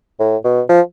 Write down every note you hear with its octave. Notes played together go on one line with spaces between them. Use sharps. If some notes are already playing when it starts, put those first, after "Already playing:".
A2
B2
F3